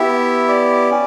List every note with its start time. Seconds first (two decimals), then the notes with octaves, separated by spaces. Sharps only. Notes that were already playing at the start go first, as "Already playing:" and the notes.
Already playing: B3 E4 G4 E5
0.49 D5
0.91 C#4